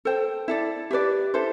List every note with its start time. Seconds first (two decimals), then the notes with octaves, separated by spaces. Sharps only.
0.05 A4 C5 G5
0.48 E4 A4 D5
0.91 G4 B4 D5
1.34 E4 A4 C5